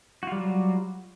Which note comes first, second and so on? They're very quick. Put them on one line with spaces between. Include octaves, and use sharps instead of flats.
F#4 F4 G3 F#3